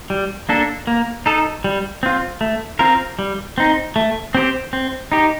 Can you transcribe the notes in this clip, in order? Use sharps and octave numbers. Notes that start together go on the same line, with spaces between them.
G3
A#3 D4 A4
A#3
D#4 A4
G3
C4 F4
A3
C4 F4 A#4
G3
C4 D#4
A3
C4 G4 C5
C4
D#4 G4